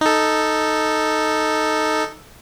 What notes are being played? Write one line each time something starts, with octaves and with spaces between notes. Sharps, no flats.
D#4 A4